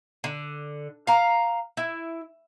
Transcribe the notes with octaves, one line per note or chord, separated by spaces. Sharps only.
D3
F5 A#5
E4